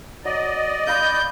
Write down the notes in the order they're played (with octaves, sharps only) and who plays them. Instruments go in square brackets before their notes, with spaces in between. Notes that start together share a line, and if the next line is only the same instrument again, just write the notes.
[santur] F#3 [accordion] D5 D#5
[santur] F5 B5 C6 [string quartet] G6